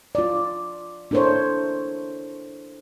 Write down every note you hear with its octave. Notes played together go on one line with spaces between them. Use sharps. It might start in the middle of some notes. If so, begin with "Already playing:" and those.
F4 D5
D4 E4 A4 A#4 C5 C#5